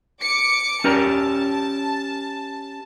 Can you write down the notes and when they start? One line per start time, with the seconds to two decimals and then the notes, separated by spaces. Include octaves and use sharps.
0.21 D6 C#7
0.84 C#4 G4 A#4 A5